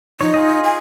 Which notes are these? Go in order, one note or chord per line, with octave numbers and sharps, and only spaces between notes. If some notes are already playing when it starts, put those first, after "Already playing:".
F3 D#4 C#5
F4 G#4 D#5
G#5